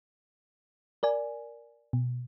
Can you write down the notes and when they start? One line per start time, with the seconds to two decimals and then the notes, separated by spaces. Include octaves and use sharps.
1.03 A#4 D5 G#5
1.93 B2